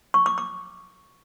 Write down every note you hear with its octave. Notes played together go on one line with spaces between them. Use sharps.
C#6
D6
D6